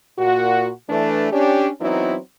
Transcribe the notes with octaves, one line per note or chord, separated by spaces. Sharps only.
A#2 F#4
E3 A3 D4
C#4 D4 G4
E3 F#3 B3 C4 D#4 E4